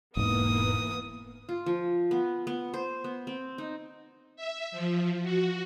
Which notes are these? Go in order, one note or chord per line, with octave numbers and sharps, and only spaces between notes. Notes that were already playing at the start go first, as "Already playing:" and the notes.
E1 G#2 E3 A#3 B3 D#6
F4
F3
B3
B3
C5
B3
C4
D#4
E5
F3
F#4